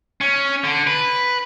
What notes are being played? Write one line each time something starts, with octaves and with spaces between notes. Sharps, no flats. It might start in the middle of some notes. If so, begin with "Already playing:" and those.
C#4
D3
B4